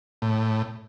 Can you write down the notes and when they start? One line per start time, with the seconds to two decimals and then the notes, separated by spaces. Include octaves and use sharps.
0.22 A2